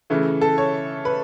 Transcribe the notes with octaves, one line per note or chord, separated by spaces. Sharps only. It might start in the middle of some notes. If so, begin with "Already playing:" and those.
C#3 E3 A3
A4
C#5
B4